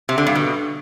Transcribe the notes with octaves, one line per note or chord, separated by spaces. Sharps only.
C3
D3
G2
B2